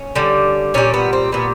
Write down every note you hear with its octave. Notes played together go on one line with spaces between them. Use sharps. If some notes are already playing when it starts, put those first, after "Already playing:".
Already playing: C#4
D3 G3
A#2 G3 C#4
B3
C4
A#2 G3 B3